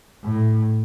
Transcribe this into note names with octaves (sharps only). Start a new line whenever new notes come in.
A2